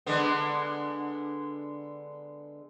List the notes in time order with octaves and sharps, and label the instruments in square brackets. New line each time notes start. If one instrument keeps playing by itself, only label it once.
[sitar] D3 G#3 B3